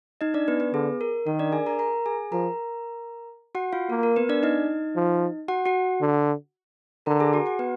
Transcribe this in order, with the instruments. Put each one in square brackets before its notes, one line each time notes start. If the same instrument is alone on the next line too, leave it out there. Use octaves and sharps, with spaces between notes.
[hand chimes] D#4 D#5
D4 D5
B3 B4
B3 B4
[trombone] D3 [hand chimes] G#4
[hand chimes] A#4
[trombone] D#3 [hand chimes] A#4
[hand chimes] D4 D5
G#4 G#5
A#4 A#5
A#4 A#5
G#4 G#5
[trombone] F3 [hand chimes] A#4 A#5
[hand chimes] F#4 F#5
F4 F5
[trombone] A#3 [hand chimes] A#4
[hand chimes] A#4
B3 B4
D4 D5
D#4 D#5
[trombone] F3
[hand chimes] F#4 F#5
F#4 F#5
[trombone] D3
[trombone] D3 [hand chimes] A#4 A#5
[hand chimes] G#4 G#5
F#4 F#5
F#4 F#5
B3 B4